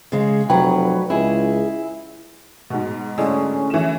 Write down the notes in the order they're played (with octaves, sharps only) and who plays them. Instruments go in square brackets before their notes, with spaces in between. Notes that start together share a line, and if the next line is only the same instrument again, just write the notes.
[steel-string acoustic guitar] C#3 G#3
[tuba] F1 [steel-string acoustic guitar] F#3 [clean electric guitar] B4 [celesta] G5
[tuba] C#2 [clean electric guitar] E4 [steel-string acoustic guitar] G#4
[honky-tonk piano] G#2 B2
[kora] A2 D3 G#3 [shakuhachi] C#4
[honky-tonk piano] E3 E7